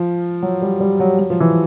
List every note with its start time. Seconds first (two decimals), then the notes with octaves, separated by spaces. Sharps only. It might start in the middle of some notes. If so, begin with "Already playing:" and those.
Already playing: F3
0.42 F#3
0.62 G3
0.80 G3
1.00 F#3
1.19 F#3
1.30 F3
1.40 E3